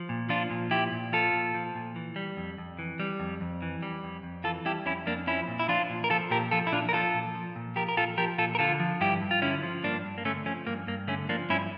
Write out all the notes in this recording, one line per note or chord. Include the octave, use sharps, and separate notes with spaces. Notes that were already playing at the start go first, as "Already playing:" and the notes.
Already playing: F3
A#2
F3 D4 F4
A#2
F3 E4 G4
A#2
F3 F4 A4
A#2
F3
A#2
E3
G3
F2
F2
E3
G3
F2
F2
E3
G3
F2
F2
E3 F4 A4
G3 E4 G4
F2 C#4 E4
F2 A#3 D4
F3 C#4 E4
A#2
E4
F3 D4 F4
A#2
A#4
F3 F4 A4
A#2 G4 A#4
F3 F4 A4
E4
A#2 D4 F4
A#4
F3 F4 A4
A#2
F3
A#2
F3 G4 A#4
A#4
A#2 F4 A4
F3 G4 A#4
A#2 F4 A4
A#4
D3 F4 A4
F3
G2 E4 G4
G2
F4
D3 C#4 E4
F3
G2 A#3 D4
G2
A#3
D3 A3 C#4
F3 A3 C#4
G2 A#3
G2 A#3
D3 A3 C#4
F3 A#3 D4
G2 C#4 E4